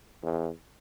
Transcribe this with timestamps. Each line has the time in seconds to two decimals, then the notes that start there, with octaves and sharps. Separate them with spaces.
0.23 E2